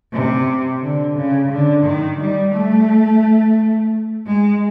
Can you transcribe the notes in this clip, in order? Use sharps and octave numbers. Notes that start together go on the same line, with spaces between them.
C3
D3
C#3
D3
D#3
G3
A3
G#3